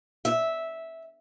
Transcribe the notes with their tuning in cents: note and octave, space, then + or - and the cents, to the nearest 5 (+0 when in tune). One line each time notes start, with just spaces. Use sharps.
E5 -10